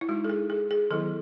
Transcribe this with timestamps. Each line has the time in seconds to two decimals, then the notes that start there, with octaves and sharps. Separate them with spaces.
0.01 E4
0.09 G#3 D#4 F#4
0.24 A4
0.30 G#4
0.50 G#4
0.71 G#4
0.90 D#3 F#3 B3 E4 A4